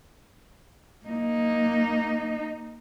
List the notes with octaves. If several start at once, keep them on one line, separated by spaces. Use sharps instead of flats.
A#3 D#4